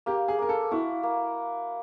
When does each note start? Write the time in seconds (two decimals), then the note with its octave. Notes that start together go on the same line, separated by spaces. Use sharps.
0.06 A#3 G4
0.28 G#4
0.39 A#3 A#4
0.49 A4
0.71 E4 F#4
1.03 A#3